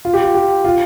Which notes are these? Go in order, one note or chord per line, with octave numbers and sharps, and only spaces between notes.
F4
G4
F4
G4
F4